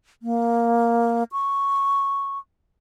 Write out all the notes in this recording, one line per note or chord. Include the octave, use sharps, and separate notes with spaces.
A#3
C#6